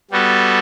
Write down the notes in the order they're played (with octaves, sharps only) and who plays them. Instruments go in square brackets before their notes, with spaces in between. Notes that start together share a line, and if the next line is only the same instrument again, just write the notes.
[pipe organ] G3 B3 F#4 A4